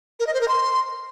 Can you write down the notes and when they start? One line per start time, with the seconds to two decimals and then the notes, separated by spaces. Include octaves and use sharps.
0.20 A#4
0.27 D#5
0.34 C5
0.41 A#4
0.48 C6